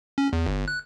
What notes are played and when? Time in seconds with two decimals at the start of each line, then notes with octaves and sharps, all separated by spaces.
0.18 C#4
0.33 E2
0.47 G1
0.68 F#6